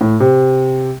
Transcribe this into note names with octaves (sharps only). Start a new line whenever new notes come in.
A2
C3